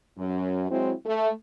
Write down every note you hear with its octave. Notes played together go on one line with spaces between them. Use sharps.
F#2
F#3 G#3 C4 E4
A3